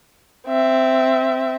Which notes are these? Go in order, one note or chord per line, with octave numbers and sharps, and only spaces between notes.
C4 E5